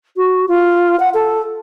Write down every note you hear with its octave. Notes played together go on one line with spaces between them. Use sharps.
F#4
F4
F#5
A4